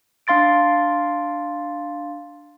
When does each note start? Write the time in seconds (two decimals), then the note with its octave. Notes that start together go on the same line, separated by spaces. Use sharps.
0.27 D4 F5 C6 A6 D7